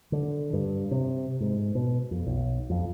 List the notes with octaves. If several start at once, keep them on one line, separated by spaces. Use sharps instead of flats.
D3
G2
C3
G#2
B2
F2
B1
F2